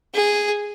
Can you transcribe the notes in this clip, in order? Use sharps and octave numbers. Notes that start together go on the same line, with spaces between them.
G#4